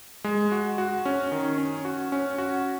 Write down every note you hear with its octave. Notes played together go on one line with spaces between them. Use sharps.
G#3
F#4
F#4
C#4
D#3
C#4
F#4
C#4
F#4